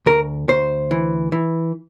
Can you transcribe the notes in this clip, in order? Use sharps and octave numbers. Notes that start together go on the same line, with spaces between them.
D2 A#4
D2 C5
E3
E3